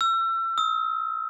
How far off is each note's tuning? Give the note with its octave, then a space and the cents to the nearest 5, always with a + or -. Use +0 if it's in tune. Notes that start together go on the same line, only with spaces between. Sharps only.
E6 +35
E6 -45